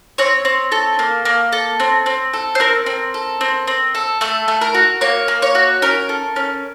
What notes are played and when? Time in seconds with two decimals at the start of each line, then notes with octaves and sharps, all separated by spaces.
0.18 C4 C#5
0.45 C4
0.72 A4
0.99 A#3
1.25 A#3
1.52 A4
1.80 C4
2.06 C4
2.33 A4
2.55 C5
2.60 C4 A#4
2.86 C4
3.14 A4
3.41 C4
3.67 C4
3.95 A4
4.21 A3 A4
4.48 A3
4.61 A#4
4.75 F#4
5.01 A#3 C#5
5.28 A#3
5.42 C#5
5.55 F#4
5.82 C#4 A#4
6.09 A4
6.36 C#4